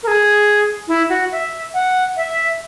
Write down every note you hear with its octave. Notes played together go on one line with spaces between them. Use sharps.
A#4
G#4
E4
F#4
E5
F#5
E5